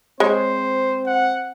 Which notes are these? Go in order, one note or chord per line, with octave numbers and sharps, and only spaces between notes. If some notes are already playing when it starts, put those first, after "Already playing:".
G#3 C4 C5 C#5
F#5